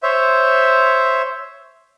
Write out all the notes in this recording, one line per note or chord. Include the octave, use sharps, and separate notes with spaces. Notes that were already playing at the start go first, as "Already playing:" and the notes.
C5 C#5 E5